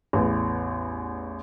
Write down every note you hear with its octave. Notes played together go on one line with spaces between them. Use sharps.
A1 E2